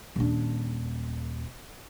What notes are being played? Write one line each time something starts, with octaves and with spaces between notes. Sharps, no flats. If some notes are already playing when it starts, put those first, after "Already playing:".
D#1 D4